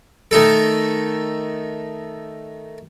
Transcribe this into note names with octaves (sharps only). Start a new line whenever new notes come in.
D#3 A3 D#4 A4